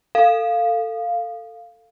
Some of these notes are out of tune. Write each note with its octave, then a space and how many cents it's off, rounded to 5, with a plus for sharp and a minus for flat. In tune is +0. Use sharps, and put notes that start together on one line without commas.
A4 +20 F5 +0